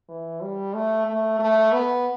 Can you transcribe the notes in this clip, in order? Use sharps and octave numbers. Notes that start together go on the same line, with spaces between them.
E3
G3
A3
A3
A3
B3